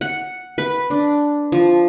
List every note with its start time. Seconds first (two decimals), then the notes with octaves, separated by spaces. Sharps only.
0.01 F#5
0.58 B4
0.90 D4
1.52 F3